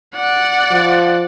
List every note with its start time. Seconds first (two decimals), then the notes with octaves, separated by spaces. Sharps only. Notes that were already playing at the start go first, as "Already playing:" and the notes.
0.15 D5 F#5
0.71 F3